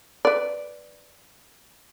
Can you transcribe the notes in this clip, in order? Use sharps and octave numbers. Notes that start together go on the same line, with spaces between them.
B4 D5